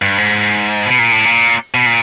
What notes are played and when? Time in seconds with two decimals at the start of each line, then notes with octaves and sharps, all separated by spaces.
0.02 G2
0.18 G#2
0.86 B2
0.99 A#2
1.12 A2
1.25 A#2
1.74 B2
1.86 A#2